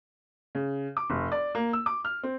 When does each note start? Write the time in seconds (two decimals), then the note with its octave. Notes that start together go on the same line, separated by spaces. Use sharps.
0.55 C#3
0.97 D6
1.10 F1
1.32 D5
1.55 A#3
1.73 E6
1.86 D6
2.05 F6
2.23 C4